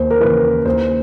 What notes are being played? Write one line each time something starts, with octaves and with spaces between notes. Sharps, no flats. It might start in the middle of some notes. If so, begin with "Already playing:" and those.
Already playing: D#2 C5
A#4
C#3 E3 B4
D#2 C5